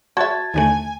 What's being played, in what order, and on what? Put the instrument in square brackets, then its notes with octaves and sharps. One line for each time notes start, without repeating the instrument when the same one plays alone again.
[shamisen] F#4 E5 [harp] A5 G#6
[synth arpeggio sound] D#2 D3 A3 [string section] G#5